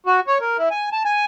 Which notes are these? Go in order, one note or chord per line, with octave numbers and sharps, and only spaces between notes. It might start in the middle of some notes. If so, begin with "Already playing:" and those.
F#4
C#5
A#4
E4
G#5
A5
G#5